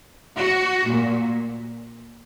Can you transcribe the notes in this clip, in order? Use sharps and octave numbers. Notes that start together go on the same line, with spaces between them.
F#4
A#2